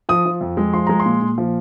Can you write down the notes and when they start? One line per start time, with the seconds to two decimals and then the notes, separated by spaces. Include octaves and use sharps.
0.09 F3 D#6
0.26 F3
0.41 F2
0.57 G#3
0.73 F3 C6
0.87 G#3 A#5
1.00 C6
1.06 A#2
1.22 A#2
1.38 F3